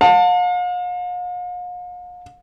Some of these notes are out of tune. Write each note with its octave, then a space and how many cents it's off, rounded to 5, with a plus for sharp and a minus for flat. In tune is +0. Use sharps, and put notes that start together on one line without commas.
F5 +45 A5 +30